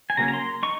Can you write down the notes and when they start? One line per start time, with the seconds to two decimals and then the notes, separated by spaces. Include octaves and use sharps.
0.10 G#5
0.17 C#3 F#3 A#3 C#4 A#5
0.28 A#5
0.33 C6
0.63 D#4 C#6